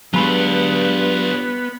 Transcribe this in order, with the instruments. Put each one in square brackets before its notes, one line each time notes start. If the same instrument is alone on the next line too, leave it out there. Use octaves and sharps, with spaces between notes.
[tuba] G2 [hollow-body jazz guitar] F#3 G#3 B5 [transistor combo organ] B3 [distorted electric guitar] F4 C#5